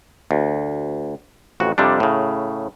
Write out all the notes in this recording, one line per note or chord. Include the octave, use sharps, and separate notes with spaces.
D2
A1 F2 F#4
F2 C3 G3 D4
A2 C#3